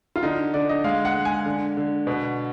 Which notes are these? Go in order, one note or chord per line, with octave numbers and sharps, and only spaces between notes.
F4
D3 D#4
D3 D5
D#5
G#3 F5
F#5
G#3
G#5
D3
D3
B2